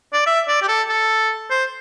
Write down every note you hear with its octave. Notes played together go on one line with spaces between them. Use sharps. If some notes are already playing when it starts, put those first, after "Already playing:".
D5
E5
D5
G4
A4
A4
C5